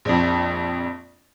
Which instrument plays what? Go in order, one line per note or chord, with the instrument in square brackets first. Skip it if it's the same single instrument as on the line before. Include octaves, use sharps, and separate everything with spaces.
[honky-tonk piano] A#1 F2